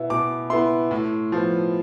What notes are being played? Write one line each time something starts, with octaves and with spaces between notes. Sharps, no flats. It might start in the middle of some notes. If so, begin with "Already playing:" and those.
Already playing: B2 B3 E4
B2 D6
B3 E4 C6
A2
F3 B3